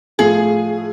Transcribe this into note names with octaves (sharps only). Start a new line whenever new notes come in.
A2 F3 A3 G#4